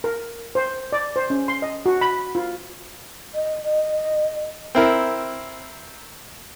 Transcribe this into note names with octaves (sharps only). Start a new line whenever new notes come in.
A#4
C5
D5
C5
C#4
C6
D#5
F#4
B5
F4
D#5
D#5
C4 E4 A#4